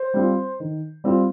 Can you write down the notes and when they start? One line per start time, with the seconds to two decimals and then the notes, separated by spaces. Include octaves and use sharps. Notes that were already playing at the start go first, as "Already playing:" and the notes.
Already playing: C5
0.14 G3 C4 F4
0.60 D#3
1.04 G3 C4 F4